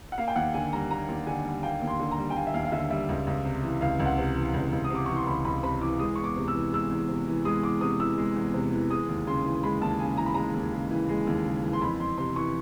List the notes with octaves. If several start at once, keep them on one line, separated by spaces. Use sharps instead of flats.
F#5
A#3 F5
G5
D#2 F#5
D3 G#5
G3 A#5
A#3 A#5
D#2
D3 G#5
G3
A#3 G5
D#2
C6
D3
A#5
G3
G5
A#3 G#5
E5
D#2 F5
F5
D3 E5
G3 E5
C#2
C#2
C3
E3
C#2 F5
C#2
F#5
C3
E3
C#2
C#2
D#6
C3 D6
E3 C#6
C6
C#2 B5
C#2 B5
C3 B5
E3 D6
G#3 D#6
E2 C#6
D6
C3
E6
E3
G#3 E6
E2
C3
E3
G#3 D#6
E2 D6
C3 D#6
E3 E6
G#3
E2
C3
E3
G#3 D#6
D#2
C#3 C6
E3
G#3 B5
D#2 A5
C#3 G#5
E3 A#5
B5
G#3 A#5
D#2
C#3
E3
G#3
D#2
C#3
E3
C6
F2 B5
F2 C6
C3 C6
E3 C#6